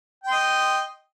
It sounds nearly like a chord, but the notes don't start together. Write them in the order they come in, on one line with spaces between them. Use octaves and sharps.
G5 C6 D#5